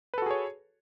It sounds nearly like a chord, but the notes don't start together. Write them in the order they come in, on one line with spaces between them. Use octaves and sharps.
B4 A4 F#4 G#4 C#5